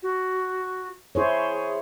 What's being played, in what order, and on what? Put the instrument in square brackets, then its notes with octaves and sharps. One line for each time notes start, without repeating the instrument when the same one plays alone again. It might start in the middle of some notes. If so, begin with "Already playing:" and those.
[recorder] F#4
[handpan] E4 C5 C#5 [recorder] G#4